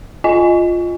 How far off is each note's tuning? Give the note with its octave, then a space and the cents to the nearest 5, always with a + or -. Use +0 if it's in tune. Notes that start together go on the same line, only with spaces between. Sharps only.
F4 +0 D#5 +0 G#5 +0